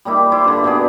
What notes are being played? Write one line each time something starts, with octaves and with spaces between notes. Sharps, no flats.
G3 A#3 D#4 E4
E4 C5 D5
G2 D3
B2 D4 G#4